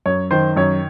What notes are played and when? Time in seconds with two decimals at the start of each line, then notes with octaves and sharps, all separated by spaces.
0.06 F#2 C#5
0.31 D#3 C5
0.56 F#2 C#5